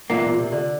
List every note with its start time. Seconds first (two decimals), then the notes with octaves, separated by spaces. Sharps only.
0.10 E2 A#2 E3 A#3
0.24 A#2
0.39 C3
0.52 D3